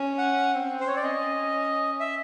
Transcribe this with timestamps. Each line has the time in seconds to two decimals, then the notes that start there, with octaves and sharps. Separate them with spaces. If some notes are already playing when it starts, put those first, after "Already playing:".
Already playing: C#4
0.18 F#5
0.55 C4
0.80 C5
0.87 C#5
0.96 D5
1.03 C#4 D#5
2.00 E5